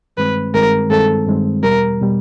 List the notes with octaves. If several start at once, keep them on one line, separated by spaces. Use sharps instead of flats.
G2 D#3 G#3 C4 B4
G2 D#3 G#3 C4 A#4
G2 D#3 G#3 C4 A4
G2 D#3 G#3 C4
E2 B2 G3 A#4
B2 G3